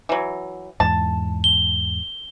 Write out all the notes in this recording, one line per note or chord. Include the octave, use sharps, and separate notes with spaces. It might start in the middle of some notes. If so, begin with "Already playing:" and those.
E3 F#3
E2 G#2 A5
G7